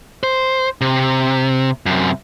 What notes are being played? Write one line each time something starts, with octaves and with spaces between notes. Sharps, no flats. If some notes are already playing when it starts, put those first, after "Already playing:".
C5
C3
F#2 C3